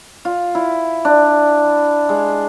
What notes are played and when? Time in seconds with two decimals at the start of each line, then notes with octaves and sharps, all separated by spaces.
0.25 F4
0.55 E4
1.05 D4
2.09 G#3